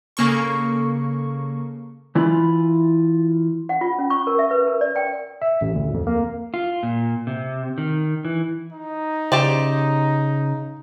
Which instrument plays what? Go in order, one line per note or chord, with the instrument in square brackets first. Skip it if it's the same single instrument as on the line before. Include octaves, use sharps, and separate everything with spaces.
[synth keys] C#3 A#3 A4 C#6
[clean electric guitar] E3 E4 F4 B5
[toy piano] F#5
F4
C#4
C#6
A#4
E5
B4
A#4
D5
G5
[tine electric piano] E5
A1
D2
F2
A#3
[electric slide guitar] F4
A#2
C3
D#3
E3
[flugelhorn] D#4
[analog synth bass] C#3 [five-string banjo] G4 C5 D5